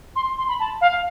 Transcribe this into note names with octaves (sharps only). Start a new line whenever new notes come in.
C6
C6
B5
A5
F5